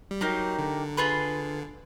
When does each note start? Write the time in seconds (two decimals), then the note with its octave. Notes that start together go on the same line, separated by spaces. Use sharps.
0.11 G3
0.21 F#3 A#3 D#4 G4
0.59 D3
0.97 F4 G#4 B4